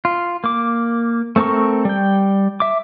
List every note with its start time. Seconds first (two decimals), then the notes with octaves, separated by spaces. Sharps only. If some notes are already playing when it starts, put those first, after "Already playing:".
0.05 F4
0.44 A#3 D6
1.36 A3 C4 A4 A#4 C#6
1.85 G3 G5
2.60 E5 D6